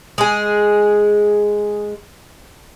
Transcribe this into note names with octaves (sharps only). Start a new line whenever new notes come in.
G#3 G#4